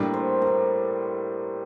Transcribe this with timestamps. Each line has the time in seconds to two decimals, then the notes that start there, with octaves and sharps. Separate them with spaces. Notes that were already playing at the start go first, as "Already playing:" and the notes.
Already playing: A2 G3 A#3 D4 A#4
0.14 C5
0.42 A#4